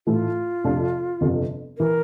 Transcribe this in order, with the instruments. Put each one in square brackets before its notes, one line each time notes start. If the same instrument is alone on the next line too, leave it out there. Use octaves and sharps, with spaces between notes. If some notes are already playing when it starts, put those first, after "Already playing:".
[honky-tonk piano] A2 E3 A3 [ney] F4
[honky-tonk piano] F2 C3 F3 A3 D4
G1 F2 C3 F3
[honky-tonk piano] E3 [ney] A#4